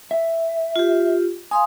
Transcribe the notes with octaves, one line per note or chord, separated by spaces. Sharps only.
E5
F4 G4
F5 G#5 C6 D#6